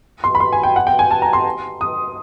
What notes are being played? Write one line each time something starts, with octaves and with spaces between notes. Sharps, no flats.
C6
B5
C6
G#5
G5
F#5
G5
G#5
A5
A#5
C6
D#6